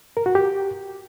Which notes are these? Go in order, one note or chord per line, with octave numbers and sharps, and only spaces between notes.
A#4
F#4
G4